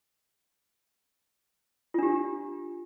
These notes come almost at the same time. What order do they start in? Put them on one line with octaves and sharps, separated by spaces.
F4 D4 G4